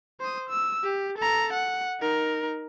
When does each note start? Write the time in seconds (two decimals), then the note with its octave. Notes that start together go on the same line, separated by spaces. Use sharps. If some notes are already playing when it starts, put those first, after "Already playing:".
0.20 C5 D#6
0.49 E6
0.83 G4
1.18 A4 A#5
1.53 F#5
2.00 D#4 A#4